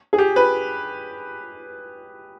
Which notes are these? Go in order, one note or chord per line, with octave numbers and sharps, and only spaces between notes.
G#4
G4
B4